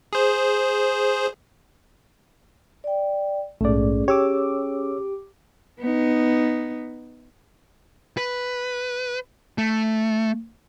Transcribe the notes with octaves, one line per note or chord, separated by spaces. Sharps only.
G#4 C5
D5 G5
A#1 G#2 A3 C#4 G#4 D5
G4 C#5 D6 E6
B3 D#4
B4
A3